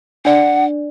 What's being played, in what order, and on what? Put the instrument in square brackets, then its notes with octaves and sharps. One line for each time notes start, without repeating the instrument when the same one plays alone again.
[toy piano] D4 D5 [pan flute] F#5